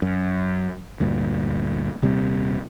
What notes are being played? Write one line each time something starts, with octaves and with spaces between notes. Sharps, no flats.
F#2
D2 G2 A#2
D#1 C3 G3 C4